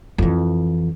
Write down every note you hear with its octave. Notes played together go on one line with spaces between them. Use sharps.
F2 E3